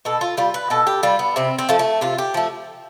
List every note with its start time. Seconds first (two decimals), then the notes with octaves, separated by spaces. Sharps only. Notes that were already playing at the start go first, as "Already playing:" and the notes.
0.05 B2 A4
0.21 F4
0.37 G3 F4
0.54 B4
0.70 B2 A4
0.87 G4
1.03 G3 F4
1.19 B3
1.36 C3 C4
1.59 C4
1.69 F3 A3
1.79 A3
2.01 C3 F4
2.18 G4
2.34 F3 A3